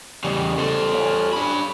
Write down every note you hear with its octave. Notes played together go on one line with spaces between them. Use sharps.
E2 C#3 G3 D#5
A4 C5
C#5 F5 G#5
D4 B5